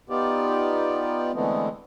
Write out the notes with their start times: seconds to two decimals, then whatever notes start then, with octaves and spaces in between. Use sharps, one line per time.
0.10 B3 D#4 F4 G4 D5
1.34 D3 E3 G#3 A3 B3 C4